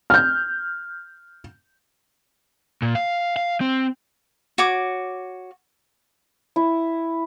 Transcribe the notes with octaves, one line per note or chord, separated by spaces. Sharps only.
F6 G6
A#2
F5
F5
C4
F#4 C#5 D6
E4